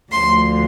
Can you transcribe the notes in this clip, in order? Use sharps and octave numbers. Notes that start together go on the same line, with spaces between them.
D2 D3 F3 C6